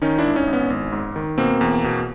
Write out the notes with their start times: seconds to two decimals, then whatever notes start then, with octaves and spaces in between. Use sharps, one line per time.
0.02 D#3 C#4 D#4
0.19 D4 E4
0.24 G#1
0.35 C#4 D#4
0.47 G#1
0.53 B3 C#4
0.70 G#1
0.92 G#2
1.16 D#3
1.38 B2 A#3 C4
1.61 E2
1.84 B2